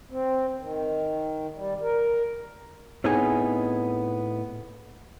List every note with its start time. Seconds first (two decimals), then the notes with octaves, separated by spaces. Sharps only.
0.11 C4
0.60 D#3
1.55 G3
1.81 A#4
3.04 A2 B3 C4 D#4 G#4 G#5